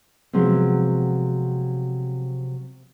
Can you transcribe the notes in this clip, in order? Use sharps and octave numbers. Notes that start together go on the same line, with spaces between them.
C3 F3 F#3 G#3 B3 C4